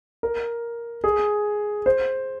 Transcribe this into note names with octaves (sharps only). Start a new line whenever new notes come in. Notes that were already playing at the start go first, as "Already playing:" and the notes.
A#4
G#4
C5